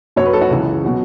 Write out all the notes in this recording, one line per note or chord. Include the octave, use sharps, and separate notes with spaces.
F#2 F#3 C#5
B4
A4
F#4
C#2 C#3 E3
B2 F#3